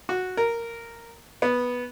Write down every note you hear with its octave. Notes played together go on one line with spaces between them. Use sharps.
F#4
A#4
B3